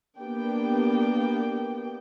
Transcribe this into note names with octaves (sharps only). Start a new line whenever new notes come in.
A#3 B3 D4 G4 G5